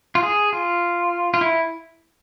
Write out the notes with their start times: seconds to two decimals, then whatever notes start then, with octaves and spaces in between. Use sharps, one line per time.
0.15 F4
0.23 G#4
0.53 F4
1.34 F4
1.41 E4